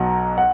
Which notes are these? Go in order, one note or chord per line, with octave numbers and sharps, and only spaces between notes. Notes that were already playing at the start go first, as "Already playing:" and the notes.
Already playing: B1 B2 F#3 F#5 A#5
F#5